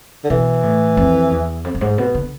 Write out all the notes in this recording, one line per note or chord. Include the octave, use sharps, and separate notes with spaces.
D3
B2 E3
A2
F2
E2
F2
F2
G#2
B2
D3